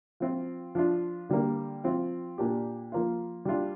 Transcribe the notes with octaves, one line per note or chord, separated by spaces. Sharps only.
F3 C4 F4
F3 D4 F4
D3 G3 A#3
F3 C4 F4
A#2 A#3 D4 G4
F3 A#3 F4
G3 D4 F4